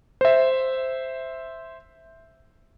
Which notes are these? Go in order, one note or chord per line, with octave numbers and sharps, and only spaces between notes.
C5 E5